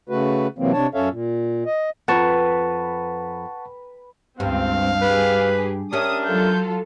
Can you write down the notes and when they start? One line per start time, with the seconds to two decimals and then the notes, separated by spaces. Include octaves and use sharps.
0.09 C#3 A3 F#4 B4
0.58 C3 E3 F#3 A#3 C4
0.73 C3 D4 C#5 A5
0.94 F#2 C#4 A4 C#5 E5 F5
1.10 A#2
1.66 D#5
2.08 F2 B4 F#5 A5 A#5 C#6
4.40 C#2 G2 C4 F5
5.02 G4 G#4 B4
5.93 C#4 D4 G4 A#4 E5 D#6
6.25 F#3 F4 A4 G6